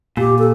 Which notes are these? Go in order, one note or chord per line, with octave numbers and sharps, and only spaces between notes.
A#2 G4
A4